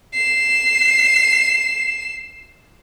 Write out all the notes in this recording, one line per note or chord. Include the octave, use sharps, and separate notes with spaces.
C7 E7